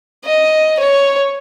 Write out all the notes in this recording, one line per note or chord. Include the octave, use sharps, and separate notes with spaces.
D#5
C#5